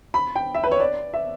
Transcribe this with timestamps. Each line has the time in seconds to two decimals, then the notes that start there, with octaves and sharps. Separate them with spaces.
0.14 B5
0.36 G5
0.54 E5
0.64 B4
0.72 C#5
0.80 D5
1.14 E5